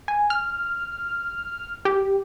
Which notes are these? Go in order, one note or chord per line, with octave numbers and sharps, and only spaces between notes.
G#5
F6
G4